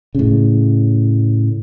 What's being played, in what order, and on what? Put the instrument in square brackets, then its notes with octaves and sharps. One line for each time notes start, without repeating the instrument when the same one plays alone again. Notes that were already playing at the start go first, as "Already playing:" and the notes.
[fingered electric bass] A2 C#3